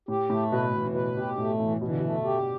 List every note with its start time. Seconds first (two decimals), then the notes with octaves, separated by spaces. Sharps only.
0.08 A2 G4
0.30 A2 A3
0.52 B2 B4
0.74 B2 E3
0.87 A2
0.94 B2 B4
1.17 B2 G4
1.38 A2 A3
1.60 A2 E3
1.81 B2 E3
1.90 D3
1.99 B2 A3
2.25 G4